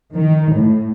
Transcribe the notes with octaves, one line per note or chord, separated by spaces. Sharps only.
D#3
A2